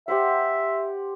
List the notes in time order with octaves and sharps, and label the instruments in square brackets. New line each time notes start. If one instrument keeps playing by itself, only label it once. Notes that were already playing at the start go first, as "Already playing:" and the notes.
[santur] G4 C5 F#5 [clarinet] E5